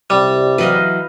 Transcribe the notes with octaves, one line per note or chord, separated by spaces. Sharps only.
C2 G3
E3 F#3 B4 D#5 F5